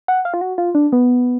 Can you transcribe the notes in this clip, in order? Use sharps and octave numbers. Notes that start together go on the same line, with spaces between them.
F#5
F5
F4
F#4
F4
D4
B3